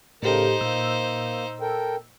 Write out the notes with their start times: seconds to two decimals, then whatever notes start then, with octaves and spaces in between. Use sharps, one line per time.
0.23 A2 C#3 D#4 G4 A4 A#4 C5
0.61 A#2 A#3 E6
1.61 A4 A#4 G5